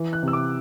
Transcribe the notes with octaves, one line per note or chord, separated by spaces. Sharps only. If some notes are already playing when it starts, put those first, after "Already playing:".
Already playing: E3
F#6
C3
E6
D6